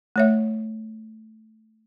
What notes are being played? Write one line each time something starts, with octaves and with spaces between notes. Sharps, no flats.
A3 C#5 E5